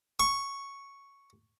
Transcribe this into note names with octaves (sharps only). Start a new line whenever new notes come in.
C#6